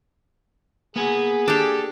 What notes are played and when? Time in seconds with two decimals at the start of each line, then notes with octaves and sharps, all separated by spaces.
0.96 A#3 B3 G#4 F#5 G#5
1.48 D4 G4 A4